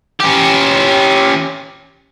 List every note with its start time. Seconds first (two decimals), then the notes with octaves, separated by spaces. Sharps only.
0.20 C#4 G4